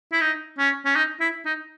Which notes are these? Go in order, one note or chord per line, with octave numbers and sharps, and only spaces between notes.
E4
D#4
C#4
C#4
D#4
E4
D#4